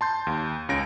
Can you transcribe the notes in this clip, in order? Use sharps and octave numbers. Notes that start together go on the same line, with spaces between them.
A5 C6 G6
D#2
C#2 C#4 A#6 D7